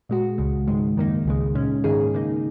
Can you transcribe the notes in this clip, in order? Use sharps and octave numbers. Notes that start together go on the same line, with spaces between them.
A#2 G#3 F#4
C#2 C#3 G#3
G#2 D#3 G#3
F#2 D#3 A#3 D#4
C#2 C#3 G#3
A#2 G#3 C#4
G#2 D#3 A#3 D#4 G#4
C#3 A#3 D#4